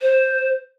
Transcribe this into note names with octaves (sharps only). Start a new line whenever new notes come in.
C5